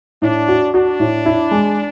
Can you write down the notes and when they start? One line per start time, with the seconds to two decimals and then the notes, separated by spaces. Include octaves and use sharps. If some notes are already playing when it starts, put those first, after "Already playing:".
0.22 A2 D4
0.48 F#4
0.74 D4 F#4
1.00 A2
1.26 E4
1.51 G#3